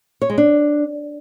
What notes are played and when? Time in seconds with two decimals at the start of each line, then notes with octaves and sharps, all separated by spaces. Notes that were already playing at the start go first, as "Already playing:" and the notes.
0.22 C#5
0.30 G#3
0.38 D4